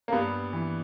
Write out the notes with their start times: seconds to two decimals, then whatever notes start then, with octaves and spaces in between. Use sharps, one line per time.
0.08 A#3
0.12 G2 G3 B3
0.53 E3